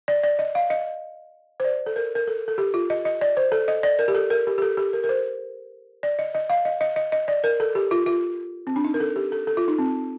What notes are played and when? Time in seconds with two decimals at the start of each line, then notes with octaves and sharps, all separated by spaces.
0.08 D5
0.24 D5
0.39 D#5
0.55 F5
0.70 D#5
1.60 C5
1.64 D5
1.86 A4
1.96 A#4
2.15 A#4
2.27 A4
2.48 A4
2.58 G4
2.74 F4
2.90 D#5
3.05 D#5
3.21 D5
3.37 C5
3.52 A4
3.68 D#5
3.83 D5
3.99 A#4
4.08 G4
4.15 A4
4.30 A#4
4.47 G4
4.58 G4
4.62 A4
4.77 G4
4.93 A#4
5.04 A#4
5.09 C5
6.03 D5
6.19 D#5
6.35 D#5
6.50 F5
6.65 D#5
6.81 D#5
6.96 D#5
7.12 D#5
7.28 D5
7.44 A#4
7.60 A4
7.75 G4
7.91 F4
8.06 F4
8.67 C4
8.76 D4
8.84 D#4
8.94 A#4
9.00 A4
9.16 G4
9.32 A4
9.47 A4
9.57 F4
9.68 D#4
9.78 C4